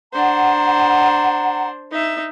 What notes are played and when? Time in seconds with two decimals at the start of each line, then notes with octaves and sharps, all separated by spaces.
0.13 D4 C5 F#5 A#5
1.92 D#4 E5